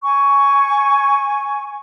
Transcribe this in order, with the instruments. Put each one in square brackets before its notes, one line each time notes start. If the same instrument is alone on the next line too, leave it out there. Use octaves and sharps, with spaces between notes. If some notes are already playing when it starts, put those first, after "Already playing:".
[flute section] G#5 C#6